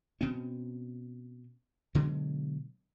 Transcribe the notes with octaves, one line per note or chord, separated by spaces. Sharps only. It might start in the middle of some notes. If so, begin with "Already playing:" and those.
B2 C4 C#4
B2 D3 F#3 G#3